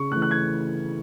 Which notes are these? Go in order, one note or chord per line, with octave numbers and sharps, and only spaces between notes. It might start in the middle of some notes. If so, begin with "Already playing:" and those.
Already playing: C#3 C#6
E3 A3 F#6
F#6
G#6